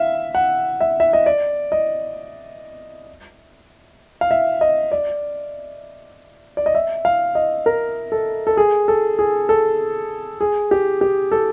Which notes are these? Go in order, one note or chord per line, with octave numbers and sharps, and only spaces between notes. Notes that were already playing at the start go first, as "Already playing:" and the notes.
Already playing: E5 F5
F#5
E5
E5
D#5
D5
D#5
F5
E5
D#5
D5
D5
D#5
E5
F5
D#5
A#4
A4
A4
G#4
A4
G#4
A4
G#4
G4
G4
A4